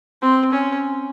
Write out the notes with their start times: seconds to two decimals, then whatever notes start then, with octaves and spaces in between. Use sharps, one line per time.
0.22 C4
0.53 C#4